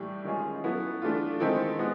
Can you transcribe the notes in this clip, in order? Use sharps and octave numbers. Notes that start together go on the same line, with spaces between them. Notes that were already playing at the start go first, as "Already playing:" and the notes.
Already playing: A2 E3 G3
D#3 G#3 C#4 F4 G#4
F#3 B3 E4 A4
E3 A3 D4 F4
D#3 G#3 C4 E4 A4
G#3 B3 E4